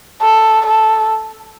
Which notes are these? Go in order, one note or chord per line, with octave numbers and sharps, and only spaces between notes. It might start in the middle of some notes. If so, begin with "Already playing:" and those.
A4
A4